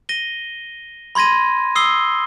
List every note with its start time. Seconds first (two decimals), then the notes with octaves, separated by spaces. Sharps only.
0.09 A#6 D#7 G7
1.15 B5 C6 G#6 A#6 D#7
1.75 D#6 E6 C7 G7